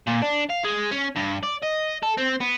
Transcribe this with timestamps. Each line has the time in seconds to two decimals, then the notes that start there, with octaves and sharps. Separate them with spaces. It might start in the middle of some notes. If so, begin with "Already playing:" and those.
0.07 A#2
0.22 D4
0.50 F5
0.65 G#3
0.91 C#4
1.16 G2
1.43 D5
1.62 D#5
2.03 A4
2.17 C4
2.40 B3